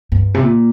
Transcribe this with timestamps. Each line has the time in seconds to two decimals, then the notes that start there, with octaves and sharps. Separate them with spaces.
0.12 G2
0.34 C3
0.42 A#2